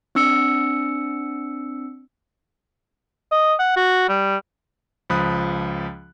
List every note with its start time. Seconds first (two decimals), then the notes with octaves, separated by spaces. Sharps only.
0.15 C4 D4 E6 C#7
3.32 D#5
3.59 F#5
3.76 F#4
4.08 G3
5.10 C#2 F3 B5 D#6 F#6